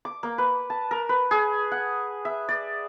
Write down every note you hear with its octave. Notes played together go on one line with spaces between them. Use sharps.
D6
A#3
B4
A5
A#4
B4
G#4
F#5
E5
D5